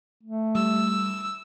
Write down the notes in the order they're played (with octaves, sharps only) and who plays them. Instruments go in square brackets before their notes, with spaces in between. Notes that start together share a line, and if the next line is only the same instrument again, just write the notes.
[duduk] A3
[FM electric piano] G3 [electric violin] E6